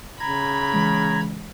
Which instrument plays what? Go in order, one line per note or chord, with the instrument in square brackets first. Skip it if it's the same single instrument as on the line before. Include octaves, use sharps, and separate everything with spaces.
[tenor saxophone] C#3 [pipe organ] A#5 G#6 [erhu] B5
[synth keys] E3 G#3